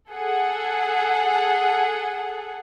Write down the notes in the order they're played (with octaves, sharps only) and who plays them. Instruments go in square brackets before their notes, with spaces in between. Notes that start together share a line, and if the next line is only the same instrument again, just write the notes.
[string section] G#4 A4 F#5